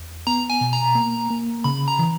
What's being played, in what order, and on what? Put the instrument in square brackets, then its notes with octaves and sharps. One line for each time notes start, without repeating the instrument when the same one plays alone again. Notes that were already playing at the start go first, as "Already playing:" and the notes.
Already playing: [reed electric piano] E2
[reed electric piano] B3 [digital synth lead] A#5
[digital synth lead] G#5
[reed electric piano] B2
[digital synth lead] A#5
[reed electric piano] A#3
A#3
[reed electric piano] C#3 [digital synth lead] B5
[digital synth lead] A#5
[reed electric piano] E3